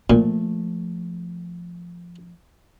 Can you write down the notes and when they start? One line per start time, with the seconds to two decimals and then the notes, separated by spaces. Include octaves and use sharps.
0.10 A#2 F3 A3